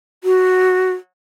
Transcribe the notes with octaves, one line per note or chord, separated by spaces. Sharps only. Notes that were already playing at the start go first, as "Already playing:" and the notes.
F#4